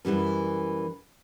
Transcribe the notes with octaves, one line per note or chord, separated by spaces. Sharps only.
F#2 E3 G3 C#4